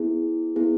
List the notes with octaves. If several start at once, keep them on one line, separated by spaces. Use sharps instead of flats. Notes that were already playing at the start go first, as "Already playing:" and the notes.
Already playing: B3 E4 G#4
B3 E4 G#4